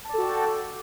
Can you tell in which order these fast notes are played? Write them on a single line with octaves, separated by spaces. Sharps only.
A5 D5 A4 F#4 G5